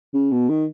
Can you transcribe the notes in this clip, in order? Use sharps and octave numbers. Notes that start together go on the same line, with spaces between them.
C#3
B2
D#3